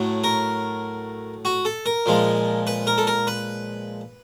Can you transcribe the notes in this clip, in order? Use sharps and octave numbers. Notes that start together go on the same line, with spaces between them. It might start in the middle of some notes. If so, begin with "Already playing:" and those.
Already playing: A2 F#3 A3
A#4
F#4
A4
A#4
A#2 F3 G#3
B4
A#4
A4
A#4
B4